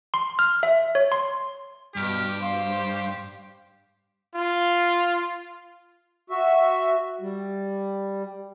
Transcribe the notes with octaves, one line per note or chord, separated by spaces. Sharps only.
C6
F6
E5
C#5
C6
G2 B2 G4 G5 F6
C5 F5
F4
F#4 E5
G3